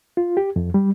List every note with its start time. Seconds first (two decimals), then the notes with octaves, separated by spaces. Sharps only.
0.17 F4
0.37 G4
0.56 F2
0.74 G3